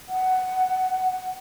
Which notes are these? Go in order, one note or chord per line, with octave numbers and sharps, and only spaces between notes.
F#5